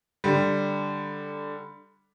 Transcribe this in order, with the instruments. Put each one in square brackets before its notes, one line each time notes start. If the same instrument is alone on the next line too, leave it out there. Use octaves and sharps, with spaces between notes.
[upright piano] D3 G3